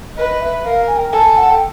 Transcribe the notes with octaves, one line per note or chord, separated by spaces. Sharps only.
B4 D#5
E5
A#4 F5
G#5
G5
A4 G#5
F#5
G5